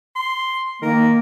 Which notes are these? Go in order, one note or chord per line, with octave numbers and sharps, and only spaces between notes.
C6
D#3 A#3 A#4